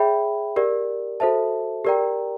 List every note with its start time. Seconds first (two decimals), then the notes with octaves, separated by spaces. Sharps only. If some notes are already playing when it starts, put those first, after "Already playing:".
Already playing: G#4 C#5 E5 G5 B5
0.56 G4 A#4 D5
1.20 F#4 A4 C5 E5 A5
1.85 G4 A#4 D5 G5 A#5